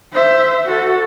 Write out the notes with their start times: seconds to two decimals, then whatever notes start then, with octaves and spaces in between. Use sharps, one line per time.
0.13 C5 E5
0.66 F#4 A4